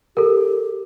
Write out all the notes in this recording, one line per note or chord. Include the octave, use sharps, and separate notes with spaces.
G4 A4 A#4